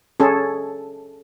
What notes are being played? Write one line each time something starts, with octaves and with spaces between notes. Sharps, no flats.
C#4 G#4 A4